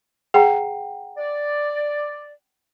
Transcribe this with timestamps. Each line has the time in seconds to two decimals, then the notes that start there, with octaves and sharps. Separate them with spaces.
0.34 G#4 F#5 G5 A#5
1.18 D5